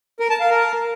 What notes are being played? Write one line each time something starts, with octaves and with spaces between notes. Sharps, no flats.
A#4
A5
F5
A#4